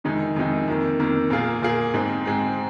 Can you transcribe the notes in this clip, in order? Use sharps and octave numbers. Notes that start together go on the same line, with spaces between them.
F2 C3 D#3 G#3 D#4
F2 C3 D#3 G#3 D#4
F2 D#3 A#3
F2 D#3 A#3
A#2 A#3 F4 G#4
A#2 A#3 F4 G#4
G#2 G#3 C4
G#2 G#3 C4